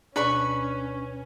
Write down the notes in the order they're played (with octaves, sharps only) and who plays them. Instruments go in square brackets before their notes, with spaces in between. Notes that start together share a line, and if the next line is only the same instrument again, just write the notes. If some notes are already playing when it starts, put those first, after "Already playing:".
[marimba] D2 B2 [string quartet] C#4 [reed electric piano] D4 [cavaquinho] B4 B5 C#6